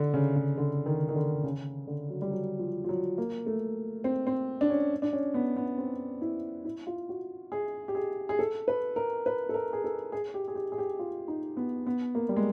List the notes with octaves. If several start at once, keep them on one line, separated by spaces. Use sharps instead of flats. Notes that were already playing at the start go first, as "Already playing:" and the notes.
Already playing: D3
C#3
C#3
D3
D#3
D#3
D3
C#3
D3
F#3
G3
F#3
F3
F3
F#3
A#3
A3
C4
C4
D4
C#4
D4
C#4
B3
B3
C4
E4
E4
F4
F#4
G#4
G4
G#4
G#4
A4
B4
A#4
B4
A4
A#4
G#4
A4
G#4
G4
G#4
G4
G#4
G4
F4
D#4
B3
B3
A#3
G3
G#3